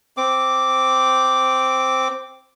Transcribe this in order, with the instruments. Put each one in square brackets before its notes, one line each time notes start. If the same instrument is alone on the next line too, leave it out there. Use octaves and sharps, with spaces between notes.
[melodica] C4 D6